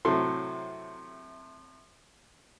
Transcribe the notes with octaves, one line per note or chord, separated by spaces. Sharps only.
A2 C3 F#3 A4 C6